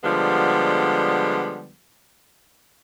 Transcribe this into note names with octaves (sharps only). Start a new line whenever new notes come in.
D3 F3 G3 G#3 B3